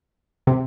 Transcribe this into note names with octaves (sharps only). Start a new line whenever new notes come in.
C3